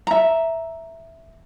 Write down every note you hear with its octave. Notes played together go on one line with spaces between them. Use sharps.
E5 A#5